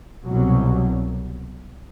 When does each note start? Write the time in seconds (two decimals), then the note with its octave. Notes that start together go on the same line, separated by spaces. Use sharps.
0.24 C2 B2 F#3